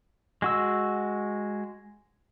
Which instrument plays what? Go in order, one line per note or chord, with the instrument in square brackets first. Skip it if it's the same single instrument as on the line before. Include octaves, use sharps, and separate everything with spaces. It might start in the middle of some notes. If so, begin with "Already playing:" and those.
[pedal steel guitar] G#3 F#4 E6